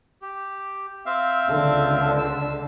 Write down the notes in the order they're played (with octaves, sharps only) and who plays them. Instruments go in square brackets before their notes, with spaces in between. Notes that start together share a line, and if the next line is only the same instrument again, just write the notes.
[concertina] G4
C4 E5 F5
[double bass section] C#2 D3
[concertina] E6